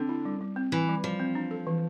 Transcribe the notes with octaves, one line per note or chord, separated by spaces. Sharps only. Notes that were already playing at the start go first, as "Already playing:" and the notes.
Already playing: D3 C4
E4
G3
G3
C4
E3 E4
G3
F3 G3
C4
D4
A4
E3